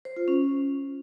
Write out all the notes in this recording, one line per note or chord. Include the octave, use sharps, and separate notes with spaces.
C5
F4
C#4